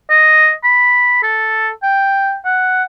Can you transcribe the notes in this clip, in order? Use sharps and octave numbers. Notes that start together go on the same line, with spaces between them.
D#5
B5
A4
G5
F#5